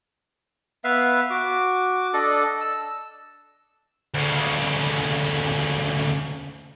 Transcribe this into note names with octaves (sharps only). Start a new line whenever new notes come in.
B3 B4 E5 F5
F#4 D6
D4 A4 D5 D#5
E6
D2 C#3